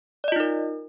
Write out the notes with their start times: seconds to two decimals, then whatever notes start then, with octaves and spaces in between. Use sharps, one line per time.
0.24 D5
0.28 D#5
0.32 F4
0.36 D#4
0.40 A#4